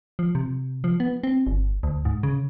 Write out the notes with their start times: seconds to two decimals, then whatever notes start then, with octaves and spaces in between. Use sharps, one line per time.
0.19 F3
0.35 C3
0.84 F3
1.00 B3
1.23 C4
1.47 G1
1.83 D2
2.05 G#2
2.23 C#3